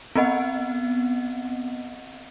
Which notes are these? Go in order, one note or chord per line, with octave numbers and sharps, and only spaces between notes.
B3 C4 D#5 F#5